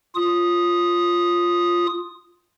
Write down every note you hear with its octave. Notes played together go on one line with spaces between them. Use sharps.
F4 D#6